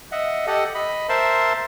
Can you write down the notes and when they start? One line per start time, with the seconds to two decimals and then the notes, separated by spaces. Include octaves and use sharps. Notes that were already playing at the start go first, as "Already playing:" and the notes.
0.12 D#5 E5 F#5
0.47 G4 A4 D#5 F#5
0.75 D#5 B5
1.09 A#4 C5 E5 A5 C6